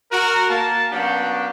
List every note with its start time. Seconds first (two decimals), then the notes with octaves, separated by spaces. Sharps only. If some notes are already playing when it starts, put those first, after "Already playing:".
0.12 F#4 A#4
0.49 A#3 A5
0.92 F#3 A#3 B3 C#4 D4 G4